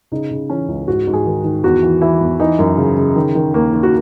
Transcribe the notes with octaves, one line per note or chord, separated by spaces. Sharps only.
C#3 D#4
C#3
E3 C#4
C#2
G#2 F#4
G#2
G#4
D#3
D#3
E2 F#4
E3
E3 E4
E2
E3 D#4
F#2
C#3
C#3
D#3
D#3
D#2 A#3
D#3
F#4